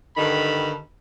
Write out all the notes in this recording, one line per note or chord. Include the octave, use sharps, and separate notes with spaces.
G2 D3 D#3 B5